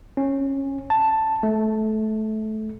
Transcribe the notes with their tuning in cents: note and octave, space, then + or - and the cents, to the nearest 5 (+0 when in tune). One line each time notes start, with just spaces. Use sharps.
C#4 -20
A5 +5
A3 -20